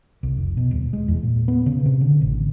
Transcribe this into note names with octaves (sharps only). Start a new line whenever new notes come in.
C2
F1
B2
D#1
G#3
E2
A#2
B3
C#3
C3
D3
A1